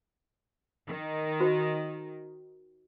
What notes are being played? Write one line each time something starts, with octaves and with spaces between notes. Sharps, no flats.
D#3
F#4 C5